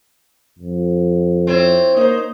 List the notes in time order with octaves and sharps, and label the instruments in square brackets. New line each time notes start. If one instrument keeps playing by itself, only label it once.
[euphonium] F2
[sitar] C4 E4 C#5
[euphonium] A#3 [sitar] D#4 C5